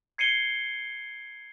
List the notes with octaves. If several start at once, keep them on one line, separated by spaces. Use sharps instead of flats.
G#6 C7 C#7 D#7 G7